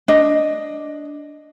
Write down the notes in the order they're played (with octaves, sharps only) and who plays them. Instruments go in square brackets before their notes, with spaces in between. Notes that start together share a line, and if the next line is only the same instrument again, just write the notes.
[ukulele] D4 D#5